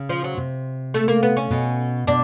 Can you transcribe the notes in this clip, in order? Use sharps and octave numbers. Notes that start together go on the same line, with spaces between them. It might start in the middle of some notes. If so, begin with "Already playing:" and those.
Already playing: C#3
F3
F#3
C3
A3
A#3
B3
C#4
B2
B2 D4